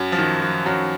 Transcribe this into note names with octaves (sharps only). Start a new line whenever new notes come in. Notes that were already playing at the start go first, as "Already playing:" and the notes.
Already playing: F#2 F#3
F3
D#3
F3
F#2 F#3